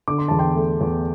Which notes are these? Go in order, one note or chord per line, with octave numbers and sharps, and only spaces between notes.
D3 D6
C6
E2 A5
G5 C6
A3
E2